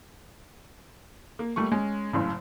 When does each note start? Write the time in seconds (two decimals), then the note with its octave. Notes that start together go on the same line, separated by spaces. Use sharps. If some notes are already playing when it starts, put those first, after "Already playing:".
1.39 A#3
1.56 G3 A3 A#3 C#6
1.72 G#3 C#4
2.13 F#1 A2 C#3